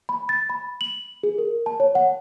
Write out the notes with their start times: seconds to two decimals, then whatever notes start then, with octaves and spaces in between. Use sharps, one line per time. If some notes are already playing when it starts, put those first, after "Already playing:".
0.09 B5
0.29 A6
0.50 B5
0.81 F#7
1.23 G#4
1.38 A#4
1.66 A5
1.80 C#5
1.95 F#5